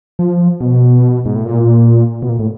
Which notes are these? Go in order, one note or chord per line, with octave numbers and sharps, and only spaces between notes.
F3
B2
G#2
A2
A#2
B2
A#2
A2